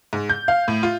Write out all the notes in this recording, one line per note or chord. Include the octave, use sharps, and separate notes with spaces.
G#2
G6
F5
A2
F4